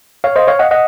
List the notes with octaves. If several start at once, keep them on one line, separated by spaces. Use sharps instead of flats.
C#5 F5
C5 D#5
C#5 F5
D#5 F#5
D#5 F#5